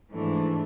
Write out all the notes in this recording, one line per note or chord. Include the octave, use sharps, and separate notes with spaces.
G#2 E3 A3 D4